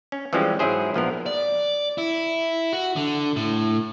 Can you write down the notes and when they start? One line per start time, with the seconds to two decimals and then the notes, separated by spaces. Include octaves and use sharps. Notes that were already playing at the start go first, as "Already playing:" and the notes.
0.12 C#4
0.33 E3 F3 G3 G#3 C4 C#4
0.59 G#2 F#3 E4 G#4 C5
0.94 A#1 F3 B3 A#4
1.26 D5
1.98 E4
2.73 F#4
2.96 D3
3.36 A2